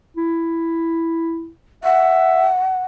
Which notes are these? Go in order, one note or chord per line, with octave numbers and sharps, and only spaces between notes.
E4
E5 F#5